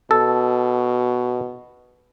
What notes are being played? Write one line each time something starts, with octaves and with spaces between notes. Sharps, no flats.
B2 A4